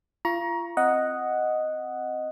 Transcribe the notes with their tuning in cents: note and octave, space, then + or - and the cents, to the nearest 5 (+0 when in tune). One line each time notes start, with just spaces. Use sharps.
F4 -30 A#5 +25 C#6 +5
C4 +0 D#5 +0 F#5 +0